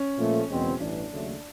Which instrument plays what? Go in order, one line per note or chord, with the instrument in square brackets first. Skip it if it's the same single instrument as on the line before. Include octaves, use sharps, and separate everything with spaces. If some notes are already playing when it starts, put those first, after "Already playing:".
Already playing: [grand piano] C#4
[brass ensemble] A#2 F3 A3
F#1 E2 B2 G#3 C4
[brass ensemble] A1 G2 E3 [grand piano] D4
[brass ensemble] D#2 C#3 F#3 A3